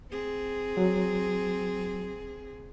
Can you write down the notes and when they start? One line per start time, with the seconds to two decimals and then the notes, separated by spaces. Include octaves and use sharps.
0.11 C4 G#4
0.77 F#3